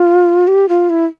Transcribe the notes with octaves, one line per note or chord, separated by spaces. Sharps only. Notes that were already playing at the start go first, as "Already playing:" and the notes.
Already playing: F4
G4
F4
E4